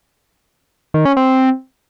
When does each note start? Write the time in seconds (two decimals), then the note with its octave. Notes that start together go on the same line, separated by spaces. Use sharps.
0.94 D#3
1.05 C#4
1.17 C4